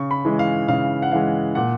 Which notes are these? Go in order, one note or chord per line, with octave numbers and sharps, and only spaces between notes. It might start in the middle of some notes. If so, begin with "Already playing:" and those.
Already playing: C#3 C#6
B5
E3 G#3
F5
C#3 F5
F#5
E3 G#3 F5
A#2 F#5